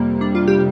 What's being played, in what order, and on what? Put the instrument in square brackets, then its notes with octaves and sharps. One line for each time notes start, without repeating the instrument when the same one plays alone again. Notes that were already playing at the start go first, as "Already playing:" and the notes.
Already playing: [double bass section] F2 C3 G3 [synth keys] A#3
[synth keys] D4
F4
G4